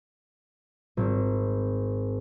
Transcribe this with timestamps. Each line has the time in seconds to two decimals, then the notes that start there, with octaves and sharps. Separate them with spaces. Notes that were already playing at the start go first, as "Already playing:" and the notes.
0.97 G#1